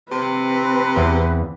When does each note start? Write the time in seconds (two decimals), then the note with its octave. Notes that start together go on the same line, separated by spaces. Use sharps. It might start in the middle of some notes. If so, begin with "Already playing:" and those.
0.12 C3 C4 B4
0.96 E2